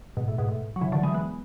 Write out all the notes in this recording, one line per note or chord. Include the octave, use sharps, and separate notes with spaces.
G#2 B2
A2
G#2 B2
A2
F#3
C#3 E3
D3 F#3
E3 G#3
G#3 B3